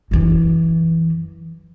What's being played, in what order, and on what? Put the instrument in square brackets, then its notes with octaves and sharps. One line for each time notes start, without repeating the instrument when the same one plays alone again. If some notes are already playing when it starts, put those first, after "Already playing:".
[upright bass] F#2 E3